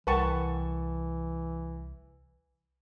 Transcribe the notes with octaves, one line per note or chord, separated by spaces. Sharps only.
C2 E3 A#4 B4 F#5 G5 A5 C#6